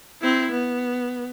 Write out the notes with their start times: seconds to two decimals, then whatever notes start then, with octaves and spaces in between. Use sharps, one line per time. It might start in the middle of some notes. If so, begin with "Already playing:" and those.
0.22 C4 E4
0.52 B3